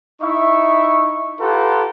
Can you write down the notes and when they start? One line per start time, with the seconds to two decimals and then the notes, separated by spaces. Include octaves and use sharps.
0.22 D#4 E4 E5 C#6
1.40 F4 G4 A4 B4 F#5 A#5